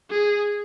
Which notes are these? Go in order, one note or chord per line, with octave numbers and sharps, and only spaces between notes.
G#4